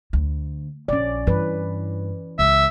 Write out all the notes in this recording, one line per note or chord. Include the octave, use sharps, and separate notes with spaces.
D2
A#1 C#4 D5
G2 E3 B4
C#2 E5